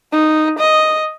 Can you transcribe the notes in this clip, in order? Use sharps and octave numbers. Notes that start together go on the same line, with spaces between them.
D#4
D#5